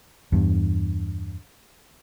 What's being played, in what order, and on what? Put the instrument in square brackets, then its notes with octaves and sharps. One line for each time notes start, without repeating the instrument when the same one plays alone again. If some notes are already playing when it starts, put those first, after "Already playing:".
[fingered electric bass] E2 G2